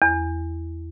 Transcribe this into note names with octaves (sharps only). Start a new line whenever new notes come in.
E2